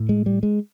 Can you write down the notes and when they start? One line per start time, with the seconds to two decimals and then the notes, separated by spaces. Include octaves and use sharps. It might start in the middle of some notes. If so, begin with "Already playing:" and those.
Already playing: A2
0.09 G#3
0.26 G3
0.43 G#3